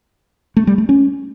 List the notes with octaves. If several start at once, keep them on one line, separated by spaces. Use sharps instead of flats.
A3
G3
A3
C#4